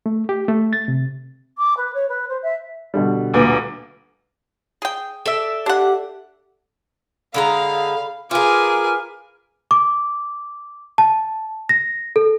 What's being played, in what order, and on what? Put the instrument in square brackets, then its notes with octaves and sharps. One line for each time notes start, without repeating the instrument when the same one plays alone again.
[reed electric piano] A3
G4
A3
A6
C3
[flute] D6
B4
C#5
B4
C5
E5
[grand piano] B2 D3 G3
[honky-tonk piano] D2 A#2 B3
[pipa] G#4 G5
[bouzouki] A4 D5 E5
[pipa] D4 F#5 [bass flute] G4
[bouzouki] D3 G#3 A#5 [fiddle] F5 [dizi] B5
[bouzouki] F4 A#4 [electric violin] G#4 D6 [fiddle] B4 G#5 [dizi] F6
[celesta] D6
A5
A#6
A4